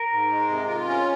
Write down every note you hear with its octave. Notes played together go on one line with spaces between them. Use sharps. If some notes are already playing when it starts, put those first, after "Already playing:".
Already playing: A#4
G#2
G#3
C3
F4
C#4